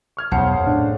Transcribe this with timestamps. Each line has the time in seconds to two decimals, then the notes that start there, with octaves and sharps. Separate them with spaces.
0.17 C#6 F6 G#6
0.32 B1 E2 C#3 C5 F#5 A5
0.54 F#2
0.66 A2 D4